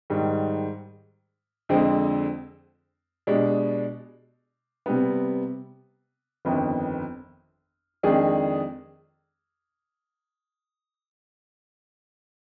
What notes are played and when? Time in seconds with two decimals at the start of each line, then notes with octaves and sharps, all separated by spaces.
0.10 G#2 D#3 G3
1.69 F2 D3 G#3 C4
3.27 B2 G#3 D4 G4
4.86 C3 G3 B3
6.45 G1 F2 D#3 B3
8.03 F2 D#3 G#3 D4 G#4